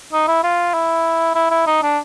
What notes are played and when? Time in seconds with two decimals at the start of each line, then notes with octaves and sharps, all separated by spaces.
0.13 D#4
0.28 E4
0.44 F4
0.74 E4
1.35 E4
1.51 E4
1.67 D#4
1.83 D4